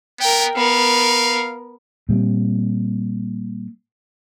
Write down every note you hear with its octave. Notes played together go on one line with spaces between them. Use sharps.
B3 A#4 G5
B3 A#4 F5
A#2 G3 A#3 C4